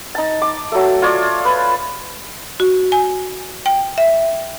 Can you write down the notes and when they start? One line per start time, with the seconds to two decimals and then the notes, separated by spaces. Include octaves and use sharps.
0.15 D#4 A5
0.42 D6
0.72 F#3 A3
1.02 F4 C#5 D5
1.45 B4
2.60 F#4
2.92 G#5
3.66 G5
3.98 E5